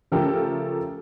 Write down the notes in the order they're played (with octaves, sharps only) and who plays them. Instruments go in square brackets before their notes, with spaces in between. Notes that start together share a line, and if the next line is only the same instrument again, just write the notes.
[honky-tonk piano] C#3 F3 A3 G4 A4 A#4